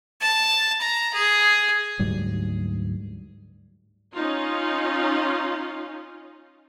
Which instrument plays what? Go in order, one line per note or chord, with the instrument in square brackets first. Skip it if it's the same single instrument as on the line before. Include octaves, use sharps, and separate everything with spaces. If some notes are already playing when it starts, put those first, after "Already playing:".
[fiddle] A5
A#5
G#4
[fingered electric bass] D2 G#2 F#3 G3
[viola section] C#4 D#4 F4